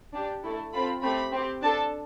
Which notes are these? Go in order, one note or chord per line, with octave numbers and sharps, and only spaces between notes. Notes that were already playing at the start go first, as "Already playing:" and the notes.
D4 G4
A3 E4 A4
C4 F4 A4 B5
A3 C4 G4 B5
C4 G4
D4 A4 A5